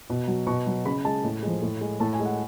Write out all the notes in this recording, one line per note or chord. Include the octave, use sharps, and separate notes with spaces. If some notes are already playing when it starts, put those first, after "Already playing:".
B2
F#3
B2 C#6
F#3
C#3 B5
G#3 A5
A2
F3 G#3
A2
G#3
A2 A5
G#5
G#3
F#5